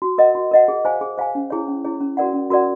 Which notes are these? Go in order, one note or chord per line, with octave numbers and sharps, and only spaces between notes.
F#4
A#4 D#5 F#5
F#4
A#4 D#5 F#5
G#4
C5 F5 G#5
G#4
C5 F5 G#5
C#4
E4 G#4 C#5
C#4
E4 G#4 C#5
C#4
F#4 A#4 D5 F#5
C#4
F#4 A#4 D5 F#5